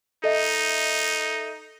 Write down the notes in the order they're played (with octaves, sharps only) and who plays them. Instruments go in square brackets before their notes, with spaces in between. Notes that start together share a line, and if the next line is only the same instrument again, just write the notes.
[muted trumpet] D#4 [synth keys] A4 D#5 E5